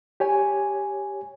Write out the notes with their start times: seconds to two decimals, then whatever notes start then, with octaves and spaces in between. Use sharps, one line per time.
0.20 G4 C#5 G#5